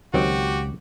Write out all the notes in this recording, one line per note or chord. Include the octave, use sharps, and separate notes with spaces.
C#2 D#3 F#3 C4 F#4 G4